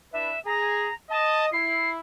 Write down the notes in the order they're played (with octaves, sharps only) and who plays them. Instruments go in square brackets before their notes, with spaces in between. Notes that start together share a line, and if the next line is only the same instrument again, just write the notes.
[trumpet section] D4 E4 B4 [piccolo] E5
[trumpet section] G#4 [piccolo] A#5
[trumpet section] D#5 [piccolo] A5
[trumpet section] E4 [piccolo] C7